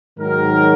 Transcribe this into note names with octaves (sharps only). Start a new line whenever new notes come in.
G#2 D#3 F#3 A#4